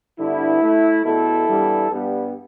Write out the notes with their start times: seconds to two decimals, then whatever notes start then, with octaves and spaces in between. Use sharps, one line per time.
0.19 G2 D3 B3 E4
0.62 A2 A3
1.05 E2 B2 A3 E4 A4
1.48 G2 E3 G3 B3
1.91 G2 G3 B3